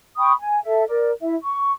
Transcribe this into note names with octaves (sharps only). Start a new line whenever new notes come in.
G5 B5 C#6 D#6
G#5
A4 E5
A#4 D5
E4 E5
C#6